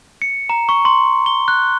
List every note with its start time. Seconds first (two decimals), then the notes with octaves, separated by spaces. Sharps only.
0.22 C#7
0.49 A#5
0.69 C#6
0.85 C6
1.26 G7
1.48 F#6